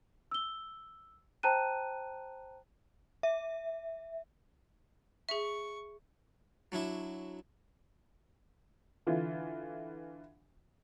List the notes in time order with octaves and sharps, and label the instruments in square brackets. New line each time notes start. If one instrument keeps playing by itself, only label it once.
[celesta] E6 G7
C5 G5 A5 A#5 F#6 D#7
[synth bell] E5
[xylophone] G#4 E5 [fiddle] C#6
[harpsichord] F#3 D4 E4 E5
[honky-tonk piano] D3 E3 F4